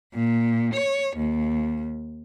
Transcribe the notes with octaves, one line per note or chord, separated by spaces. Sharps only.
A#2
C#5
D#2